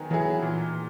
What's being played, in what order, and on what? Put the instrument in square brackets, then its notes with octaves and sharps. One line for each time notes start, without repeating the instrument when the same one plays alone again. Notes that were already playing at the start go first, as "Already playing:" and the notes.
Already playing: [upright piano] D#3 F#3 B3 G#4
[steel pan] E3 [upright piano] F#3 B3 E4 G#4
[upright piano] A#2